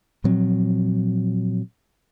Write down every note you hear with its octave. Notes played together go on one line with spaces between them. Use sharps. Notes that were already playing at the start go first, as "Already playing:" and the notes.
A#2 F3 F#3 C4